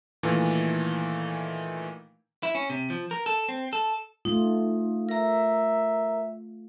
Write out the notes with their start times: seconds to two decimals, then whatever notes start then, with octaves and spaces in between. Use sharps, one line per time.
0.23 A#2 D#3 E3 A3
2.43 E4
2.55 C#4
2.70 C3
2.90 F3
3.11 A#4
3.26 A4
3.49 C4
3.73 A4
4.25 A3 D#4 F4
5.09 A#4 E5 A#5